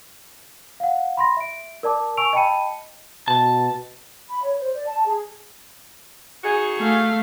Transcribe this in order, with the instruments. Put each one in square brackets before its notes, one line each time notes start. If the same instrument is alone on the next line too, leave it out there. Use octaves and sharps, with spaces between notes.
[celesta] F5 F#5
B5 C6 A#6
E5 D7
A#4 D5 A5 D6
G#5 C#6 E6 D7 F7
D#5 G5 A5 B5 C#7 D#7
[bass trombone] B2 [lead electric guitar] A5
[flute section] B5
C#5
C5
D5
A5
G#4
[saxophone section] D#4 F#4 G#4
[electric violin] A3 F5